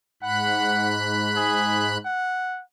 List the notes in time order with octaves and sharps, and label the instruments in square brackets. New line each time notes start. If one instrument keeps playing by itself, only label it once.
[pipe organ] G#2 B5 F#6 [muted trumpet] F#5
[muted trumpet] G#4
F#5